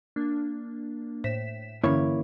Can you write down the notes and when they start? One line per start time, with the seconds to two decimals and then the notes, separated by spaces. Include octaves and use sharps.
0.16 A#3 D4
1.24 A2 C5 B6 E7
1.84 G2 D3 E3 A#3 C#4 E4 C#5